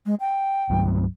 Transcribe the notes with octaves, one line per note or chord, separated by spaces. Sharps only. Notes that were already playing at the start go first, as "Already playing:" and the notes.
G#3
G5
C2 G2 F#3